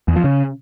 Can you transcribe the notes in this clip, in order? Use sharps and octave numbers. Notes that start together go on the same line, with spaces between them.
E2
F3
C#3